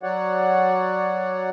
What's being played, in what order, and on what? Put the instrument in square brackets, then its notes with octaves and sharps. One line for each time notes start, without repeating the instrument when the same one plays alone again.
[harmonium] F#3 F#4 C#5 D5 F#5